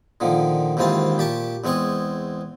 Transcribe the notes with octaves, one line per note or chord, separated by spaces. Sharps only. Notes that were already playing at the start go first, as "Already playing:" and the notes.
A#2 D3 D#3 F3
D#2 G#2 E3 C4 F4 A5
A#2 G4 A5 C#6
E2 G#3 C4 G#5 C#6 D#6